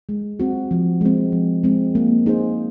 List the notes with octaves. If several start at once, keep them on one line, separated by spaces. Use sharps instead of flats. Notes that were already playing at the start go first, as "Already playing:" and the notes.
G#3
C4 F#4
F3
G#3 C4
F3
G#3 C4
A#3
D#4 G#4 C5